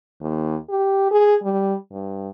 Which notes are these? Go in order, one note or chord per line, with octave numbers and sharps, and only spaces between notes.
D#2
G4
G#4
G3
G2